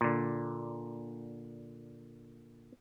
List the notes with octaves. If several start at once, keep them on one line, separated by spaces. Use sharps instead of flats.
A#2 D3